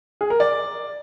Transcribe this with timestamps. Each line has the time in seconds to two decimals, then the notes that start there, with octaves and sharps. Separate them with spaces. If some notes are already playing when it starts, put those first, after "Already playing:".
0.21 G#4
0.30 A#4
0.40 D5